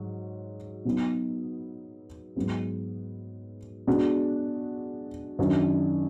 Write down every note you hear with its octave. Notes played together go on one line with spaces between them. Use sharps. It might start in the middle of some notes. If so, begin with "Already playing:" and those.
Already playing: G#2 F#3
B2 F#3 B3 D#4
G#2 F#3 B3
B2 G#3 D4 F#4
F#2 D#3 F#3 D4